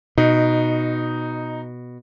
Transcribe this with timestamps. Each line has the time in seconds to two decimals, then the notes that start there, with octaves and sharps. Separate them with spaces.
0.18 B2 D#4